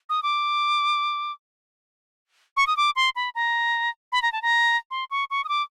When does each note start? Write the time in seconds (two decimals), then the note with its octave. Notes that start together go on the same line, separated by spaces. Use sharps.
0.09 D#6
0.23 D6
2.57 C#6
2.67 D#6
2.77 D6
2.96 C6
3.16 B5
3.35 A#5
4.12 B5
4.22 A#5
4.32 A5
4.42 A#5
4.91 C6
5.11 C#6
5.30 C#6
5.44 D#6
5.49 D6